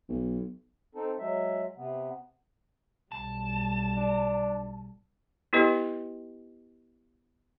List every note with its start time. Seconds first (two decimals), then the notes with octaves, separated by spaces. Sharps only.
0.09 B1
0.95 C4 D#4 A4
1.19 F#3 G#3 E5
1.77 C3 B3
3.12 B1 G3 A5
3.97 D4
5.53 B3 E4 G4 B4 D#5